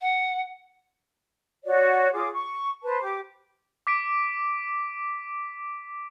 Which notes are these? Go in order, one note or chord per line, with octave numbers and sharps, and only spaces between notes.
F#5
F#4 C#5 D5
F4 G#4 D6
C#6
B4 C5 A5
G4 D6
D6 B6 D7